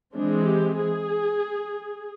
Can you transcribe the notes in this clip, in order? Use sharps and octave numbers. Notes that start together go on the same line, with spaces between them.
E3 G#3 C4 D4
G4
G#4